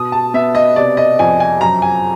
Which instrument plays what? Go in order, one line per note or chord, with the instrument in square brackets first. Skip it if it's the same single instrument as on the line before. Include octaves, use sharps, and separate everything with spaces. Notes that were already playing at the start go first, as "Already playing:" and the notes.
Already playing: [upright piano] B2 D#6
A5
B3 E5
D#5
C3 D5
D#5
F2 G#5
G#5
F#2 A#5
G#5